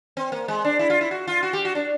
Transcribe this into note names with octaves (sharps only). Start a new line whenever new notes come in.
C4
A#3
G#3
D4
E4
F4
E4
F#4
F4
F#4
G4
F#4
D4